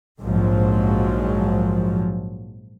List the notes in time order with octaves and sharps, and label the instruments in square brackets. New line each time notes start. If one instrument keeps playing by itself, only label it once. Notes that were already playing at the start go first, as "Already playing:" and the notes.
[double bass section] A#1 G#2 F3 F#3